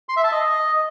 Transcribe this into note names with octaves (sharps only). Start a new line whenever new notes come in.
C6
E5
A5
D#5